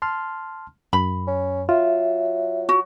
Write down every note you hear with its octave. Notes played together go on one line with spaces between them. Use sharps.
A5 C6 F6
F#2 B5
C#4
F#3 F4 E5
F#4